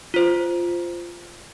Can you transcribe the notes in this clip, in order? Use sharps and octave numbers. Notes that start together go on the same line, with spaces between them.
F4 C5